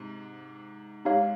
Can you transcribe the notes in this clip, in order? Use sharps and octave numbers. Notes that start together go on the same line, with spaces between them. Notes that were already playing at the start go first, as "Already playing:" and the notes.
Already playing: G#2 C3
G#2 D#4 G4 C#5 F5